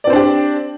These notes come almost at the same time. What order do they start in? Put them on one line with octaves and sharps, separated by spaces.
D5 C4 C5 D4 G4